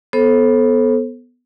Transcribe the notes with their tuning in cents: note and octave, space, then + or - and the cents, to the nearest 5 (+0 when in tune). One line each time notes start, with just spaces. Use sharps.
B3 +0 A4 -10 C5 +25